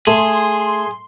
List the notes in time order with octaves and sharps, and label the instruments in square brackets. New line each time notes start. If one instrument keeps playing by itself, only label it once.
[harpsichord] A3 [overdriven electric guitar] G#4 [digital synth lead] C6